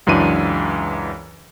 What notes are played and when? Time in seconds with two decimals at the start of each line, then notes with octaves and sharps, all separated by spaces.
0.07 C#2 F#2 E3 D4 D#7